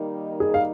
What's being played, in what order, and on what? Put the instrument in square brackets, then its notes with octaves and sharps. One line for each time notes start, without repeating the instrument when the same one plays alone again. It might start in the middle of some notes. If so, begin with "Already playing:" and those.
Already playing: [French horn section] D#3 G3 A#3 D#4
[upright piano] G#4
F5